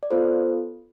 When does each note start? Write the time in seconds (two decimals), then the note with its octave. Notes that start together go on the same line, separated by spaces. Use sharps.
0.03 D5
0.11 B3 F4 A4 C5